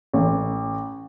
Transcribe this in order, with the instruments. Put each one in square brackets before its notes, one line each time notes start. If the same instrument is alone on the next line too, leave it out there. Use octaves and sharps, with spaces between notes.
[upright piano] A1